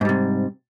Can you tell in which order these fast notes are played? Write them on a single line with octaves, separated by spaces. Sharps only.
G#2 G3 C3